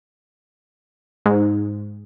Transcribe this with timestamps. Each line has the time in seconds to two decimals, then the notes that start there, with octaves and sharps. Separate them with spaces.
1.26 G#2